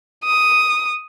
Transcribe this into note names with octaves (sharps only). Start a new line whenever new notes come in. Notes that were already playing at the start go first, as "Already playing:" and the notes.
D#6